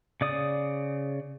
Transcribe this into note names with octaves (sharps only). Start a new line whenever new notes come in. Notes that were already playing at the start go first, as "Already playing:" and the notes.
C#3 D5 D#6